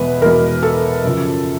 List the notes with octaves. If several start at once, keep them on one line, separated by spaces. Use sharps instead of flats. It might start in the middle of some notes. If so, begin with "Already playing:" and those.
Already playing: E2 B2 G#3 B4
E2 B2 G#3 A#4
A4
F#2 C#3 F3